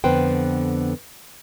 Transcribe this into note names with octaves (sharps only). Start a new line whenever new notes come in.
F2 D3 B3 B4 C5 G5